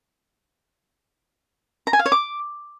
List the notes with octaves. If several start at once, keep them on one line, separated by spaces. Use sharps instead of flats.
A#5
G#5
F5
C#5
D6